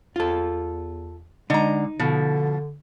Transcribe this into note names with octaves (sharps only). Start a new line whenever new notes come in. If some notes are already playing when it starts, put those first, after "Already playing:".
E2 F4 A4
D3 G#3 D#4 A#5
B2 D3 F3